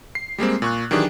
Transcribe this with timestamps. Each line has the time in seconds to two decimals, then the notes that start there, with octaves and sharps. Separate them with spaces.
0.15 C7
0.38 G3 G#3 A#3 C4
0.62 A#2 C#6 F#6
0.91 D#3 E3 F#3 D4 G4 G#4